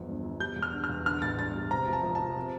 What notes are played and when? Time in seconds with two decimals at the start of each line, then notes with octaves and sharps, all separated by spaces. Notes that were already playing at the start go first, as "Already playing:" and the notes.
Already playing: G1 E2 F3
0.08 G2
0.23 G1
0.40 G3 G6
0.56 E2
0.62 F6
0.73 D3
0.84 F6
0.89 E2
1.06 D3 F6
1.22 A1 A6
1.38 G2 A6
1.55 G3
1.71 C3 A#5
1.87 F1
1.93 A5
2.03 F2
2.15 F3 A5
2.36 C3